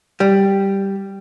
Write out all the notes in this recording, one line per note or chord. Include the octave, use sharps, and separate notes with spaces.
G3